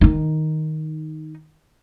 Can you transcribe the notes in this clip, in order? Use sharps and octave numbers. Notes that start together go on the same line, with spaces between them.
D#3 D#4